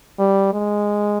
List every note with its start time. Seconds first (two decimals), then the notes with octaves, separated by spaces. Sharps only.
0.19 G3
0.53 G#3